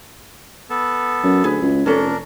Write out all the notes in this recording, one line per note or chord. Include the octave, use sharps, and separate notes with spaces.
B3 A4
F#2
D2 G#4 B4
C#2
F1 C#4 D4 A4 A#4